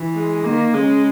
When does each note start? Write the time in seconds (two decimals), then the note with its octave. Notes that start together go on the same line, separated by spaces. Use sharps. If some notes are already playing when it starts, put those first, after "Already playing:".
Already playing: E3
0.15 G#3
0.45 D#3 A#3
0.74 C#3 G#3